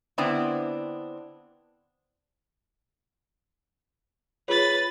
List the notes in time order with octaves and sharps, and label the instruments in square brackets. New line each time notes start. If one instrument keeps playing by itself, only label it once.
[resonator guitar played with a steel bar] D3 B3 C4 D4 E4
[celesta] F4 G#4 C#5 [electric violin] B4 A6